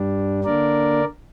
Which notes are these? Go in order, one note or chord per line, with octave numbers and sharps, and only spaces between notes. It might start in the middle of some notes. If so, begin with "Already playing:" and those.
Already playing: G2 G3 D4
D3 A#3 D4 A#4 D5